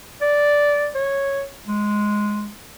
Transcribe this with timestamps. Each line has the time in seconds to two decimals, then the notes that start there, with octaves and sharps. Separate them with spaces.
0.22 D5
0.95 C#5
1.67 G#3